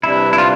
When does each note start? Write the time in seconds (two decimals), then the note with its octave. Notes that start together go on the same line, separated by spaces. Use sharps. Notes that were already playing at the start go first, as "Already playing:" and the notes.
0.03 C3 E3 G3 D4 E4
0.33 E4
0.38 F4